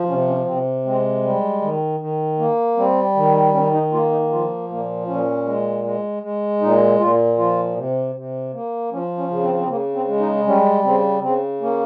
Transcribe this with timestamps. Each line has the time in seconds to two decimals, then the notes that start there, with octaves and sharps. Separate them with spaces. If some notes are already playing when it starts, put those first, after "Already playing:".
Already playing: F3
0.08 C3 C#4
0.28 C#4
0.47 C3 C4
0.85 G#3 C4
1.24 G3
1.62 D#3
2.00 D#3
2.39 A#3
2.77 G3 C4
3.16 D#3
3.54 D#3 C#4
3.73 D#4
3.92 A#3 F4
4.12 D#4
4.31 F3 F4
4.69 A#2 A#3
5.07 A#2 C#4
5.46 G#3
5.84 G#3
6.23 G#3
6.61 A#2 D#4
7.00 A#2 F4
7.38 F3 F4
7.76 C3
8.15 C3
8.53 A#3
8.91 F3 C#4
9.17 C#4
9.30 C#3
9.43 C4
9.57 C4
9.69 C#3 A#3
9.94 C4
10.07 G#3
10.20 D#4
10.46 G3 C#4
10.84 C#3 C4
11.22 C#3 C4
11.61 A#3 C#4